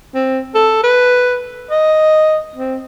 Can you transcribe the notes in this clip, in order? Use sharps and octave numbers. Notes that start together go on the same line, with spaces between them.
C4
A4
B4
D#5
C4